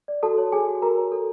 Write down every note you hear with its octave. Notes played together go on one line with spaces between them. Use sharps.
D5
F#4 A4 A5
C#5
G#4 A4 G#5
F#4
F#4 A#4 A#5
C#5
A4